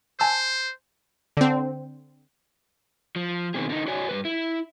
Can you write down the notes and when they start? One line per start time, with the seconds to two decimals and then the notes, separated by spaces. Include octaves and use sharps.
0.20 C5 G#5 A5 E6
1.37 D3 C4
3.16 F3
3.54 B2 D#3 E3 G#3 C4 G#4
3.69 D3 D#4
3.87 F#4 C#5 D5 G#5
4.09 G2 E3 B4
4.25 E4